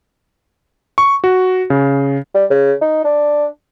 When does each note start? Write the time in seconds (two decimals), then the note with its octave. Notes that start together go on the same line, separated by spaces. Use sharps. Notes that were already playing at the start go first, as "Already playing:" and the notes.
0.98 C#6
1.24 F#4
1.70 C#3
2.35 G3
2.50 C#3
2.81 D#4
3.04 D4